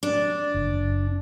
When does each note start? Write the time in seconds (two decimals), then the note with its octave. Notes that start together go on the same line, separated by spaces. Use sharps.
0.03 D4
0.54 F#1